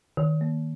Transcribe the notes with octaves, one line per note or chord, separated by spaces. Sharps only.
D#3
A#3